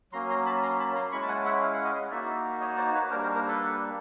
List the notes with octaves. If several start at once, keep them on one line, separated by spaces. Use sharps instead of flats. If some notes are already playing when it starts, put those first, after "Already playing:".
F#3 A#3 C#4 A#5 C6
A#5 C6
A5 B5
A#5 C6
A5 B5
A#5 C6
G#3 C#4 E4 B5 C#6
A5
F#5 G#5
E5 F#5
F5
F#5
D#5 F5
A#3 D#4 F#4 D5 E5
C#5 D#5
C5 D5
B4 C#5
G3 A#3 D4 A#4 C5
A#4 C5
A#4 C5
A4 B4